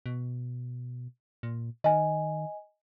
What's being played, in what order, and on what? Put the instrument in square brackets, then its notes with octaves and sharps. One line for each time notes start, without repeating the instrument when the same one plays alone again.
[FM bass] B2
A#2
[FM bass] D#3 [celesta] D#5 G#5